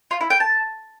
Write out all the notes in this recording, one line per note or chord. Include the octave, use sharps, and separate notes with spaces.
F4
E4
G5
A5